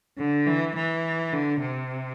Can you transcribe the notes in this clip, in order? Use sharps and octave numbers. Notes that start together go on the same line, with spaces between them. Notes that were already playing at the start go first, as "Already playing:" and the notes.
D3
E3
E3
D3
C3